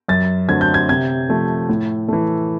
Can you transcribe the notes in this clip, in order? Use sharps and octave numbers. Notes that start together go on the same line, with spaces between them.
F#2 A6
D3 F#3 A3 C4 G#6
G6
G#6
C3 G#6
F3 A3
A2
E3 A3